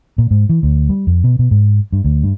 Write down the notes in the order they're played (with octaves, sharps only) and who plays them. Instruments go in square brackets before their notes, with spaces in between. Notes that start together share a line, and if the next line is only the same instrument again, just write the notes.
[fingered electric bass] A#2
G#2
E3
D2
G3
F2
B2
B2
G#2
G2
D2
G2